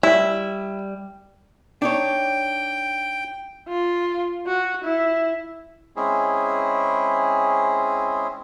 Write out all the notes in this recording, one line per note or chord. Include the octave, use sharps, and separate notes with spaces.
G3 E4
D4 D#4 C#5 G5
F4
F#4
E4
G#3 C4 C#4 E4 G#4